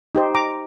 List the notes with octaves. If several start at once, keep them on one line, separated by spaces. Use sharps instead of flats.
D#4 G4 C5
A#5 D6